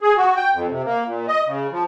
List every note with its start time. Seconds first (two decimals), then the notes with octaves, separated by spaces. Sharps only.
0.01 G#4
0.17 F#4
0.36 G5
0.54 F2
0.71 C3
0.85 A#3
1.06 A#2
1.28 D#5
1.47 C#3
1.72 F3